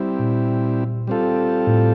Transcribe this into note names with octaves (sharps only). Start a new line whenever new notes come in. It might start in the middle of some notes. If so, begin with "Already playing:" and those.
Already playing: G3 C4 E4
A#2
G3 C4 F4 A4
A2